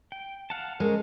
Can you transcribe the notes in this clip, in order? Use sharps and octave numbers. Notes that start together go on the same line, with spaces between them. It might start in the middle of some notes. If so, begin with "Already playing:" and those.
G5
F5 F#5 A5
G#3 C#4 A4 A#4 C5